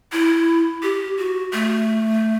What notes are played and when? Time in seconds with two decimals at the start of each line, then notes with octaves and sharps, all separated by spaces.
0.12 E4
0.83 G4
1.18 F#4
1.53 A3